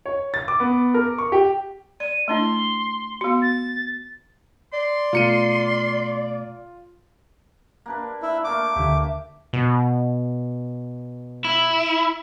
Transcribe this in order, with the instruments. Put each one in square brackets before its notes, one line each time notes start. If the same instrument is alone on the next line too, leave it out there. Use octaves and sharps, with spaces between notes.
[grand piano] C#5
A6
D6
B3
A#4
C#6
G4
[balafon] D5 [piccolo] D#7
[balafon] A3 D4 E4 [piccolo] C6
[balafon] B3 F#4
[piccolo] A6
[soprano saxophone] D5 [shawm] C6
[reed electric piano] B2 A3 A#5 [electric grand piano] F4 C#7 D#7
[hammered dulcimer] A#3 D4 B4
[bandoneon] E4
[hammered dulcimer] A3 A#3 F5 [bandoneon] D6
[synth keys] D2 D3 [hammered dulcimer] G4 E5
[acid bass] B2
[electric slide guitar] E4